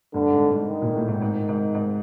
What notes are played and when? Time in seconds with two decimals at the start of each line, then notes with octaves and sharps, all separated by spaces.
0.14 G2 D3
0.32 G#2
0.50 G#2
0.68 D#3
0.82 A#2
0.95 A2
1.08 G#2
1.22 G#2 D#3
1.49 G#2
1.75 G#2